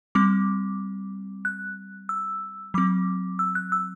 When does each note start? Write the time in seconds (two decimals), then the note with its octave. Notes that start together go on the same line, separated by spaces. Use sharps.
0.15 G3 C4 D6
1.45 F#6
2.09 E6
2.74 F#3 C4 D6
3.39 E6
3.55 F#6
3.72 E6